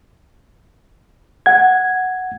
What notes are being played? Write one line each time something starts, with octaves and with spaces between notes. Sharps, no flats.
F#5 G#6